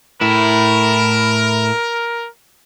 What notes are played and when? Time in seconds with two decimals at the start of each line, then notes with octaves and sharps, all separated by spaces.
0.21 A2 E4 A#4